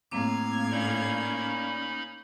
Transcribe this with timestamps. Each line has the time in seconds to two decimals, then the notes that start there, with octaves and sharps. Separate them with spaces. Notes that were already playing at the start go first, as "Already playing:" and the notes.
0.11 A2 A#3 C4 F5 D6 G#6
0.72 A#3 C#4 D#4 D5 B5